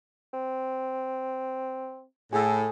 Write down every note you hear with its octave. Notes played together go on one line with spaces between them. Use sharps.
C4
A2 G#4 A4